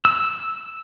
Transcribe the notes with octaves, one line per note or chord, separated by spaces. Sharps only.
E6